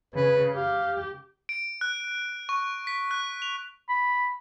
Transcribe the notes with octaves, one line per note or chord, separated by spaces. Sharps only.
C#3 B4
G4 F5
D7
F#6
C#6
B6
F#6
F7
B5